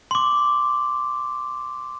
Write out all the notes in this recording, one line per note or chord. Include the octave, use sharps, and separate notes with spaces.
C6 D6